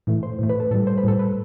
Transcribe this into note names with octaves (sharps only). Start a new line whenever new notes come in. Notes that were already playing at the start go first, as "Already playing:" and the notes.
A2 E3 A3
C5
A2 E3 A3
B4
A4
A2 G3 A4
C5
B4
A2 G3 A4
B4